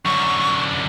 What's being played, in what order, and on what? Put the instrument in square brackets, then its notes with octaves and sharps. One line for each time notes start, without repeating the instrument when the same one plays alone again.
[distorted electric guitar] F#2 D3 [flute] C#6